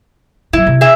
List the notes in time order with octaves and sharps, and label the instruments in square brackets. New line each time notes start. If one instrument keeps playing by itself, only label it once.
[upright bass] D#3 F#3 [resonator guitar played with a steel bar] E4
[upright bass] C3
[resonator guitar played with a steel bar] G#4 E5